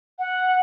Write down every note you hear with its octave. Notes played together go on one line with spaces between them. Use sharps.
F#5